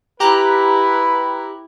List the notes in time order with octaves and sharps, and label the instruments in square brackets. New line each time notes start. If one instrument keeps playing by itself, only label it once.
[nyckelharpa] E4 [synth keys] G4 A#5 F#6 [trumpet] B4